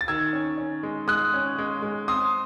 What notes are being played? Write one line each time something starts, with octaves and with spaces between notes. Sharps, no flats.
A6
D#3 E6 G#6
C#4
C#4
G#3
G#3 D#6 F#6
C#4
G#3
G#3
C4 C6 D#6